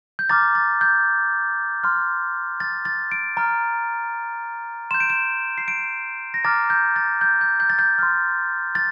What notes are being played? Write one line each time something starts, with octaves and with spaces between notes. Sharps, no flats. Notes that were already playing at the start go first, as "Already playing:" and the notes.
G6
A#5 D6 F6 A6
A6
G6
C6 F6
A6
A6
D7
A#5 F6
C6 G6 E7
D7
E7
C7
D7
A#6
A#5 D6 F6 A6
G6
A6
G6
G6
G6
A6
G6
C6 F6
A6